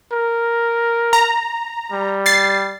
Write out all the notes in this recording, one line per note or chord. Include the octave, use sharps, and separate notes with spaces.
A#4
A#5
G3
A6 C7